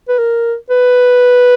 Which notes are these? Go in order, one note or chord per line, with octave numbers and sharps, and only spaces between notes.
B4
A#4
B4